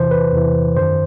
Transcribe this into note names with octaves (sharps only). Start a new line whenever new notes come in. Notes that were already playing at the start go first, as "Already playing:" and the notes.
Already playing: E2 C3 E3 C5
B4
E2 C3 E3
F#2 D#3 C5